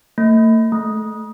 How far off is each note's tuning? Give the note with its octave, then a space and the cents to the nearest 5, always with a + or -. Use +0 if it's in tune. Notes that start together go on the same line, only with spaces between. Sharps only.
A3 +40
A3 -30